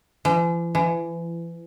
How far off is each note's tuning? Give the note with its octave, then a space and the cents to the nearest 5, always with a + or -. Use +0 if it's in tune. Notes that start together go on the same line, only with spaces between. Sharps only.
E3 +45
E3 +30